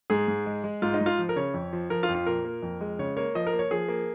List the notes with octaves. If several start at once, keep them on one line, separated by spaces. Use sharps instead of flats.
G#2 G#4
G#2
G#3
G#3
G#2 F4
D#4
G#2
F4
F3
A#4
C#3 C#5
F2
F3
F3 A#4
F4
F2
F4
A#2 A#4
A#3
F2
G#3
C#3 C#5
A#3 C#5
F3 D#5
A#4
A#3
C#5
F3 G#4
A#3